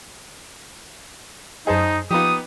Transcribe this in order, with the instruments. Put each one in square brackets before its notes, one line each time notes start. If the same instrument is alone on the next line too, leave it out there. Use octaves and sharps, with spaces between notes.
[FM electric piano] F#2 D#5 [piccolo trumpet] D#4 [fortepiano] G#4 C5 A5
[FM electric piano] F3 F4 [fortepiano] B3 D#4 G4 [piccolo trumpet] D#6